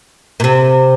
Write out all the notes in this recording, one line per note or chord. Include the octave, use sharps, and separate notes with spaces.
A#2
C3